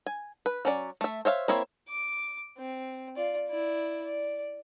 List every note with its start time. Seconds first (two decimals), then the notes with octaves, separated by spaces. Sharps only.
0.06 G#5
0.46 B4
0.65 F#3 C#4 D5
1.01 A3 E5
1.25 C5 C#5 E5 F5
1.48 A#3 C4 E4 C#5 E5
1.89 D6
2.58 C4
3.16 F4 D5
3.48 E4 D5
4.03 D5